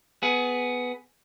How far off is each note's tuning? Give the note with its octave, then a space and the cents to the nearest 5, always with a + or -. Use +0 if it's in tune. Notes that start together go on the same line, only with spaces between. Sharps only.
B3 +5 G#4 +15